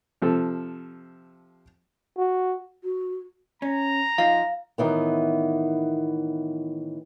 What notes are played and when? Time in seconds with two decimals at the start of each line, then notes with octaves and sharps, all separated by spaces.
0.22 C3 F3 A4
2.18 F#4
2.83 F#4
3.62 C#4 A#5
4.18 F3 D#4 F4 F5
4.78 A2 D#3 E3 B3